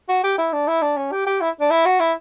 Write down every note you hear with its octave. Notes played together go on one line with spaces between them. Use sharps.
F#4
G4
E4
D4
E4
D4
C#4
G4
G4
E4
D4
E4
F#4
E4